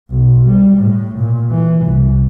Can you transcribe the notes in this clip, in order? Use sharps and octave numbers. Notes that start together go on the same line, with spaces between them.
B1
G3
A2
A#2
E3
C2